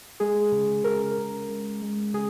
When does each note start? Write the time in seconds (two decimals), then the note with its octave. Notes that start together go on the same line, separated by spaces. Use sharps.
0.20 G#3 G#4
0.52 C#3
0.84 C#3 A#4
1.17 C#3
1.49 G#3
1.82 G#3
2.14 C#3 G#4